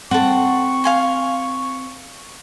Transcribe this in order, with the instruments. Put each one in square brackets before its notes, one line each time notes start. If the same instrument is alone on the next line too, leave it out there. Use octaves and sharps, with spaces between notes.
[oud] C4 [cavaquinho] A4 F#5 [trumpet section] C#6
[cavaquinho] F5 G#5 C6